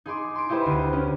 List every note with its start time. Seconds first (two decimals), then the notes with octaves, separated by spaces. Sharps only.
0.06 D#4 G#4 C6 D6
0.35 C6 D7
0.49 D#4 E4 G4 B4 C5
0.65 D2 D#7
0.93 C#4